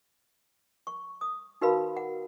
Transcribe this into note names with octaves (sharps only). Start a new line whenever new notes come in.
C#6
D#6
D#4 F#4 A#4 B4 F5 B5
F#5